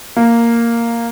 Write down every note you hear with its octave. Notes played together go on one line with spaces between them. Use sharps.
A#3